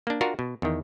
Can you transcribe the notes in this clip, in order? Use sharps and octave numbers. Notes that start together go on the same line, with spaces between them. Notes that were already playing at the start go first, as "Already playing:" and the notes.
A#3 D4
D4 F4 F#4 A#4
B2
E2 D#3